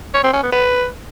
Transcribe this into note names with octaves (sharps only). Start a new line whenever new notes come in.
C#5
C4
C#4
B3
B4